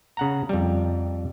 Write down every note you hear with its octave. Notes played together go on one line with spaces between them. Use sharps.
C#3 F#5 A#5
F2 G3